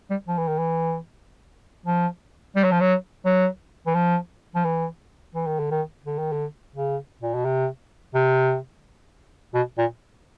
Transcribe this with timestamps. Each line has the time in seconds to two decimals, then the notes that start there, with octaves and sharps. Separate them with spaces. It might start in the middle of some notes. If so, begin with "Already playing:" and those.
0.11 G3
0.28 F3
0.38 E3
0.48 D#3
0.59 E3
1.86 F3
2.56 G3
2.64 F#3
2.72 F3
2.81 F#3
3.25 F#3
3.87 E3
3.95 F3
4.55 F3
4.65 E3
5.35 E3
5.47 D#3
5.59 D3
5.71 D#3
6.06 D3
6.19 D#3
6.32 D3
6.76 C#3
7.23 A#2
7.34 B2
7.45 C3
8.15 C3
9.55 B2
9.78 A#2